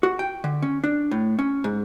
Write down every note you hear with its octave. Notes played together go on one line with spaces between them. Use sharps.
F#4
G5
D3
C#4
D4
A2
C#4
G#2